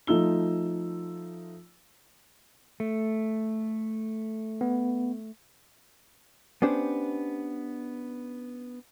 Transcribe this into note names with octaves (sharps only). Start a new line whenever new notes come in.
F3 A3 D#4 F4 E6 G7
A3
B3
B3 C#4 D4 G4 C5